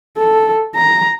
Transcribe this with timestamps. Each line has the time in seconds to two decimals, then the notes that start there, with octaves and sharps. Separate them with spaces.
0.18 A4
0.75 A#5